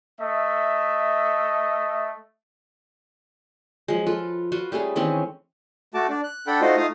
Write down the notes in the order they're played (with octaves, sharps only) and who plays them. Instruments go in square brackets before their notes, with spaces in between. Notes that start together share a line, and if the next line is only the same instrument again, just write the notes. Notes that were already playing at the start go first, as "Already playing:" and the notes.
[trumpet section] A3 D#5 E5
[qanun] F3 F#3 G#3
F4 A4 B4
F4 F#4 B4
G3 A3 C#4 G#4
D#3 E3 C4 C#4
[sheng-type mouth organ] A3 F#4 A5 D6
D4
F#6
D4 A4 F#5 G5 B5
A3 D#4 F4 F#4 C5 D#5
A3 D#4 F4 F5 D#6